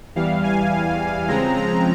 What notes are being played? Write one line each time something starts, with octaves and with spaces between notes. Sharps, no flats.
E2 E3 G3 F5
G#5
C#3 F3 G#3 C4 A#5
A#5